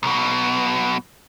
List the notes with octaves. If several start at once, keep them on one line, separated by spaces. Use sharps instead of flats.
B1 B2